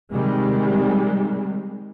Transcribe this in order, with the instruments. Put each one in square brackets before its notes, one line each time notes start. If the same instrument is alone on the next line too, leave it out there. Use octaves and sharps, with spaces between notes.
[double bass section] C3 D#3 G3 G#3